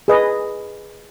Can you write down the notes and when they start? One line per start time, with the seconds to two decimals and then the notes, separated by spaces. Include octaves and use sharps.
0.08 G#4 B4 D#5